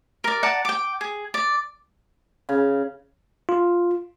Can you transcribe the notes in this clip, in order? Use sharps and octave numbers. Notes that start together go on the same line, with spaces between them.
A#4 D5
D5 F#5 A5 A#5
G5 D6
G#4
D5
C#3
F4